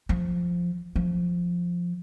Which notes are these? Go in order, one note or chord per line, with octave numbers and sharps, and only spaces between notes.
F3
F3